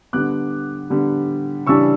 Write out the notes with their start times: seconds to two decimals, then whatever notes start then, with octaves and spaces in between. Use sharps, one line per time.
0.13 D3 G3 B3 D6 F#6
0.90 D3 G3 B3
1.67 C#3 E3 G3 D4 C#6 E6